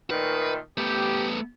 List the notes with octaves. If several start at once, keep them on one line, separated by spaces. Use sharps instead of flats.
A#2 D#3 A3 B4
A3 B3 G4